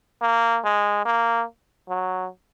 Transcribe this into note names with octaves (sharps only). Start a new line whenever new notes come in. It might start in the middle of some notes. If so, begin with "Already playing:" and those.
A#3
G#3
A#3
F#3